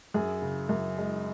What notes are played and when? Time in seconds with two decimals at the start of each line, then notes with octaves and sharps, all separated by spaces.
0.14 F#2 G#4
0.42 C#3
0.69 F#2
0.98 G#3